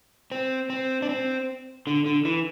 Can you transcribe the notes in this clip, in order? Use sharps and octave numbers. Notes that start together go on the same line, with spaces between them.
C4
C4
D4
C4
D3
D3
E3